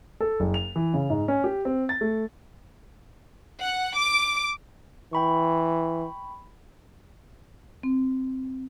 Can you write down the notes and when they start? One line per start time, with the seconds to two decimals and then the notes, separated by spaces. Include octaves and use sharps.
0.20 A4
0.40 F#1
0.54 F7
0.76 E3
0.94 C#3
1.10 G#2
1.28 C#4
1.44 G4
1.65 C4
1.89 A6
2.01 A3
3.60 F#5
3.96 D6
5.13 E3 G5 B5 C#6
7.83 C4